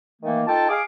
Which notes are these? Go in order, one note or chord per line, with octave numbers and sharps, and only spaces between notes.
D#3 E3 A3 A#3
D#4 F4 A4 G5 A5
G#4 F5 D6